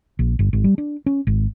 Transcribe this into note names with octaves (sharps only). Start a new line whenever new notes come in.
A#1
G1
G#1
G3
D4
C#4
G#1